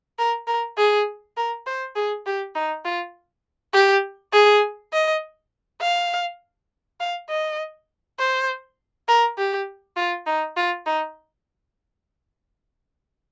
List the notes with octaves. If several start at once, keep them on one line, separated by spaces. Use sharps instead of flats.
A#4
A#4
G#4
A#4
C5
G#4
G4
D#4
F4
G4
G#4
D#5
F5
F5
D#5
C5
A#4
G4
F4
D#4
F4
D#4